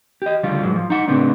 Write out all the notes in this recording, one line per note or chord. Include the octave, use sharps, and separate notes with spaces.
G4 D#5
D2 C#3 F3 G3 F4
G#2 F#3 G#3
F3
D#4 F#5
A2 C#3 B3 C4 D4